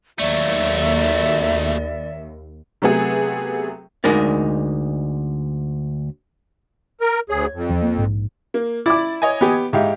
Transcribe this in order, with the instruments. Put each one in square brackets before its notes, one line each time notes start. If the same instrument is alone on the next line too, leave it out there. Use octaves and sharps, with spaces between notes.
[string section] D#2 [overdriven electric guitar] F#3 A3 [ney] D5 [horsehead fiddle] E5
[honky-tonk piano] C3 F#3 A3 B3 G#4
[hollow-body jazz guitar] D2 G#3 D#4 A#4 D5
[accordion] A#4
[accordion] D2 G#4 [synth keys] C#5 G#6
[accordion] F2
[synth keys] E2 F3
A#3
A#1 G#2
[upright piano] A#3
[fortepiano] E4 D6 [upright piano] D5
[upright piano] C#5 D#5 G#5
[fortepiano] B3 G4
[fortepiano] G#2 [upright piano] E4 G4 F5